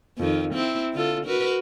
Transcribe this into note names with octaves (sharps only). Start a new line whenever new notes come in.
F2 D#3
C4 E4
D3 F4 A4
F#4 A#4 B4